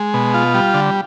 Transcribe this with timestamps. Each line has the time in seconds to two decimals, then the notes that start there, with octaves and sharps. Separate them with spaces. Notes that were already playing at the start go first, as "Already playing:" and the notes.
Already playing: G#3
0.14 B2
0.34 F4
0.54 G3
0.74 D3